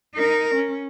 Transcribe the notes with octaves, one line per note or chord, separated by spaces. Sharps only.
D#4 A#4
C#4